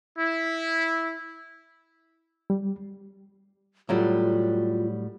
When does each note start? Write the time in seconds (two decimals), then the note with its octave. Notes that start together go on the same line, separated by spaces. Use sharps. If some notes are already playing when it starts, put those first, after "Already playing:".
0.18 E4
2.50 G3
3.89 A2 F#3 G3 F4